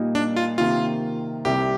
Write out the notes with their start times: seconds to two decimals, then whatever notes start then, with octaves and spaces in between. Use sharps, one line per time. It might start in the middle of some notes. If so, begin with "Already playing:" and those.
Already playing: A#2 G3 A#3 D#4
0.15 D4
0.36 F4
0.58 C3 D#3 A#3 F4
1.45 C2 C3 G3 G4